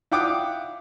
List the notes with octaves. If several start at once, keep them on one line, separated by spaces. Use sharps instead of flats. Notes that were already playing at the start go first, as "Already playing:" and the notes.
E4 F4 F#5 G5 D6 D#6